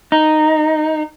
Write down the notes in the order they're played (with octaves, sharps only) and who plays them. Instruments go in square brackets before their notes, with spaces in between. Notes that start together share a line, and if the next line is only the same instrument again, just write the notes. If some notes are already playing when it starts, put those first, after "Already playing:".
[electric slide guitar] D#4